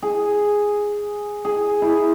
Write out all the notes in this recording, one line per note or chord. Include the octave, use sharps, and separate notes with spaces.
G#4
G#4
E4